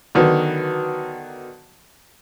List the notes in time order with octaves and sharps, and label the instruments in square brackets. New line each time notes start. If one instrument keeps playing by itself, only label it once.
[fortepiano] D3 D#3 F#3 B3